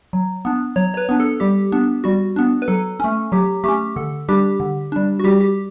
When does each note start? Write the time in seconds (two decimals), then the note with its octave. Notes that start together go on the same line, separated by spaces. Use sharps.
0.13 F#3
0.45 B3 D4
0.76 F#3 C#5
0.94 C#5
0.97 B4
1.09 B3 D4
1.20 A4
1.40 G3 G4
1.72 B3 D4
2.04 G3 F#4
2.36 B3 D4
2.62 B4
2.68 F#3 A4
3.00 A3 C#4
3.32 F#3 G4
3.64 A3 C#4 G4
3.96 D3 A4
4.28 G3 D4 G4
4.60 D3
4.92 G3 D4
5.19 F#4
5.24 G3 G4
5.41 G4